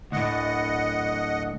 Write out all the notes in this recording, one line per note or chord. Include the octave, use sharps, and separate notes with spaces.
D2 A2 D#5 F#5